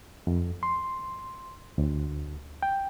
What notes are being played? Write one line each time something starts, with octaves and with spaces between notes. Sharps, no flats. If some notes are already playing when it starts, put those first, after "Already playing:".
F2
C6
D2
G5